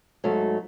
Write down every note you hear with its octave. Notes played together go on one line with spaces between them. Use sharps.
G#2 F#3 A3